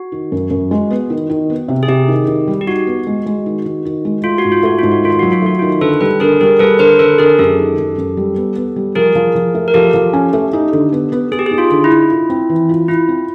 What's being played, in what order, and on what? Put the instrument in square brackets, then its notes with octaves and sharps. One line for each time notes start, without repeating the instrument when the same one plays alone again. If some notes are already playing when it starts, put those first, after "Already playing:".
Already playing: [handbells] F#4
[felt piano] D#3
F#2
F#2
G#3
B3
D#3
D#3
B3
C3
[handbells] G#4
[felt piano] C3 [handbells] G4
[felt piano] D#3
D#3
G3
[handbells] G4
[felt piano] D#4 [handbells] F#4
[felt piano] B3
G#3
G#3
D#3
D#3
D#3
G#3
[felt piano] A3 [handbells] F4
[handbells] F#4
[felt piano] G#2
[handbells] F4
[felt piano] A3 [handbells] F#4
[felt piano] G#2 [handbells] F4
[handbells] F#4
[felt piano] D#3 [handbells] F4
[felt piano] F#3 [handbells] F#4
[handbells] F4
[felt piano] A3 [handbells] F#4
[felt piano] D#3 [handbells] F4
[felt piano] D3 [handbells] A4 B4
[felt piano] G3 [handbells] A4 B4
[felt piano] D3 [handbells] G#4 A#4
[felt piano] G3 [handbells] G#4 A#4
[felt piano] G3 [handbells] A4 B4
[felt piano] D3 [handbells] A#4 C5
[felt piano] D3 [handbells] A4 B4
[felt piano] D3 [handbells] G#4 A#4
[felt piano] F#2 [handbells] G4 A4
[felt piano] D#3
F#2
F#2
G3
B3
B3
G3
[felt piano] F3 [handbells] G#4 A#4
[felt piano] F3
F3
A3
[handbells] A#4
[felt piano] F3 [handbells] G4 A4
[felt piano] F3
C#4
A3
D#4
D3
B3
B3
[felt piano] B3 [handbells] G#4
[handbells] G4
[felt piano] D#4 [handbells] G#4
[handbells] F4
[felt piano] D3
[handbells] E4
[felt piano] D#4
F4
C4
E3
F4
[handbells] E4 [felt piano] F4
[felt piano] C4